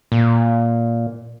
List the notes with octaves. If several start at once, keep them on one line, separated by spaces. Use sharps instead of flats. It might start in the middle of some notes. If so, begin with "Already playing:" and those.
A#2